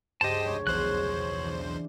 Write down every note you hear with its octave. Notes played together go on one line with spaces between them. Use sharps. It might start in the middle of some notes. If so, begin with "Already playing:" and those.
C#2 G2 G4 C5 D#5 A5
F1 G#3 A3 C#5
B1 E2 F3 G#4 C5 F#6
E3 D4